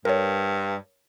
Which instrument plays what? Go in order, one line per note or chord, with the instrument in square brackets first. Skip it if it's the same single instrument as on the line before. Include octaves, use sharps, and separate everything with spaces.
[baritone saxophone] G2 [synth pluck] A#4 C#5